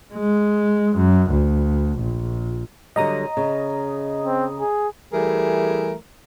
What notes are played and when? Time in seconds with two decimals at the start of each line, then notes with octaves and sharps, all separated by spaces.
0.13 G#3
0.97 F#2
1.31 D2
2.00 A#1
2.96 D3 F#3 G3 D#5 A#5 D#6
3.37 C#3
4.24 C4
4.60 G#4
5.13 E3 G3 A3 G#4 A#4